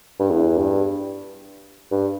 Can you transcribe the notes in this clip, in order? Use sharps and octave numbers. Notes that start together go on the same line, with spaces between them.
G2
E2
G2
G2